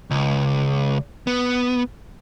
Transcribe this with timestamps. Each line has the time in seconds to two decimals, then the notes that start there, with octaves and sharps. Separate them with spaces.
0.11 C#2
1.27 B3